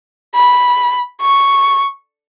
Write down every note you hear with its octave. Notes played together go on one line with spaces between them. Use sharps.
B5
C#6